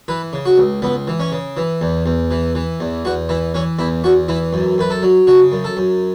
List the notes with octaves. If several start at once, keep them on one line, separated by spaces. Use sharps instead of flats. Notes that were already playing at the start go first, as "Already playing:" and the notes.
E3 B4
C#3
F#4
C#2
C#2 B3
E3
C#4
C#3
E3
E2
E2
E3
E3
E2
E2 F#4
E3 E4
E3 C#4
E2 E4
E2 F#4
E3 E4
F#2
F#2 B4
A4
F#3
C#3 F#4
F#2
A4
F#2